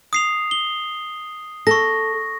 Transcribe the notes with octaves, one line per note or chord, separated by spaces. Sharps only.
D#6 C7 F7
G7
A4 C#6 A#6